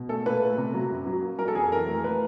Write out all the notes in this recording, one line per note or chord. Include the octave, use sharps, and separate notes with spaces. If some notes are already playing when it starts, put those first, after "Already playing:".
Already playing: B2
A3 A4
A#2 B4
A3
C3
F#3
F#2
F#3
A#3
F#3 A#4
A4
F2 G#4
E3 A#4
A3
A#3 B4